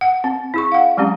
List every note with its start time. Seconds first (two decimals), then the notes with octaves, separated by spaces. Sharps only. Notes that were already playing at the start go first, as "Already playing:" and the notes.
0.01 F#5
0.24 C4
0.54 E4 G#4 C#6
0.72 F5 F#5
0.97 F#3 G#3 C4 C#4 G4